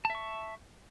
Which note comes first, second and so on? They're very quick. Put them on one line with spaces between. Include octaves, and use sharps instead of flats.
A5 E5 C#6